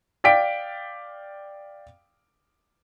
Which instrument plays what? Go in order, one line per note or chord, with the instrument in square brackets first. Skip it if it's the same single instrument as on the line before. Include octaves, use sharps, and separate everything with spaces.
[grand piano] D5 F5 G5 B6 D7